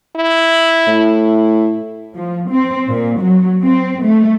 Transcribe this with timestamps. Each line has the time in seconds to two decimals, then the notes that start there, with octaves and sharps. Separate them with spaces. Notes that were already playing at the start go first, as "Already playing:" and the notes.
0.16 E4
0.87 A2
2.16 F3
2.49 C4
2.89 A#2
3.21 F#3
3.63 C4
4.04 A3